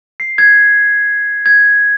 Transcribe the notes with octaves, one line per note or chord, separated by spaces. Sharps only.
C7
G#6
G#6